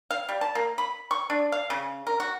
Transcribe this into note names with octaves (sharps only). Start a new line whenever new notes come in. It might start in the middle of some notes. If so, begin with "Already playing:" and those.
F5
G3
A5
A#3
B5
C#6
D4
F5
C#3
A#4
F#4